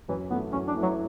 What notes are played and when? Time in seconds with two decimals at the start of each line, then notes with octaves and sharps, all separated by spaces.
0.09 F#2 E3
0.30 E3 A3 B3 E4
0.52 F#2 C#4
0.68 D4
0.75 E3 A3 E4
0.83 F#3